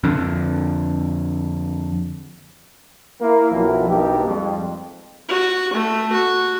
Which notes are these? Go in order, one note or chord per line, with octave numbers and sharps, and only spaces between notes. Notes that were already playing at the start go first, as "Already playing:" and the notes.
F2 D3
A#3 E4
B1 F2 F3 F#3 E4 A#4
B1 G2 A#3 D#4 G4
F2 G#2 G3
F#4
A3
F#4